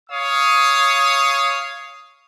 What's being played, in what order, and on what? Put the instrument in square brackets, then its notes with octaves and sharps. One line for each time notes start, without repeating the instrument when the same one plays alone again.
[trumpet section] C#5 F5 D#6